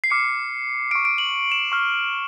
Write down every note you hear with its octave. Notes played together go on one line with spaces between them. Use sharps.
C7
D6 F6 C#7
C#6 F6 D7
D7
F#7
E7
C#6 F6